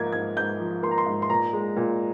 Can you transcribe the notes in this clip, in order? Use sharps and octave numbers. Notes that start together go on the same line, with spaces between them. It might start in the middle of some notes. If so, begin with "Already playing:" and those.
Already playing: G#2 F3 A#3 G#6
G#2 G#6
G#2 G6
F3
A#3 C6
A#5
C6
G#2
C6
A#2 A#5
G#3
A#2